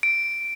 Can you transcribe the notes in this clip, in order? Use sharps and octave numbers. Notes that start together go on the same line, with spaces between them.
D7